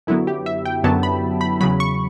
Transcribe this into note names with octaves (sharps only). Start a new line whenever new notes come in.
F#2 D3 F#3 B3 E4
G4
E5
G5
F#2 D3 F#3 B3 A5
B5
B5
E2 C#3 F#3 B5
C#6